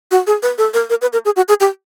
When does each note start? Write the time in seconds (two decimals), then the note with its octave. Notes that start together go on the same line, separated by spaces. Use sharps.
0.11 F#4
0.27 G#4
0.43 B4
0.58 A4
0.74 A#4
0.90 A#4
1.02 B4
1.13 A#4
1.25 G#4
1.36 F#4
1.49 G#4
1.60 G4